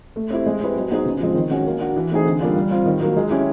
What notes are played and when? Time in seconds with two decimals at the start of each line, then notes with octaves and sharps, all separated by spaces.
0.16 A3
0.30 C4 E4 G4
0.46 G#3
0.60 C4 E4 G4 B4
0.76 F#3
0.91 B3 D#4 G#4 C5
1.06 C#3
1.20 F3 G#3 C4
1.35 D#3
1.51 G#3 C#4 F#4
1.66 A#3
1.81 D4 F#4
1.96 E3
2.11 A3 C4 D#4 G#4
2.25 D3
2.40 G3 A#3 D4 F4
2.57 G3
2.71 C4 F4
2.86 D#3
3.01 F#3 A#3
3.17 G#3
3.30 C#4 E4 G4